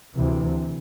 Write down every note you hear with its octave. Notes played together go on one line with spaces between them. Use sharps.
D2 C3 E3